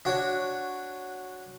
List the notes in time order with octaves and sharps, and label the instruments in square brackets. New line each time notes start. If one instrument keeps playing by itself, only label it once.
[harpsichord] D4 F#4 C#5